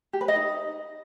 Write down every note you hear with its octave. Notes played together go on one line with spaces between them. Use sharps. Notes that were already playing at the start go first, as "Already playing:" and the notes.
G4
B4
D#5
D#4